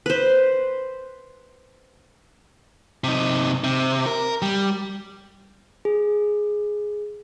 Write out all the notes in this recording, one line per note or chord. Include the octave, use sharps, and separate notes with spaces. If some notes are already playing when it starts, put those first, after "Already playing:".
B4 C5
C3 D#4
C3
A#4
G3
G#4